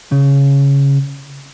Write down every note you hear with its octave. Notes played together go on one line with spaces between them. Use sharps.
C#3